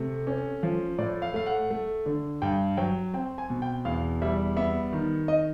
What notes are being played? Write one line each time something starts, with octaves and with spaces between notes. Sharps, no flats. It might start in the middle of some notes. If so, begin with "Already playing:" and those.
Already playing: C3 A3
C#4
F3
A2 D5
F5
A3 F5
F#5
A3
D3
G2 G5
F#3 G5
C4 G5
G#5
B2
G5
E2 F5
G3 E5
B3 E5
D#3
D#5